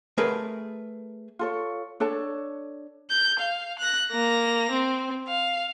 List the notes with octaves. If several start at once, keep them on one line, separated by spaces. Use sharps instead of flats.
A3 G#4 A#4 B4
F4 A4 C#5
D4 A4 C#5 A5
G6
F5
F#6 A#6
A#3 A#6
C4
F5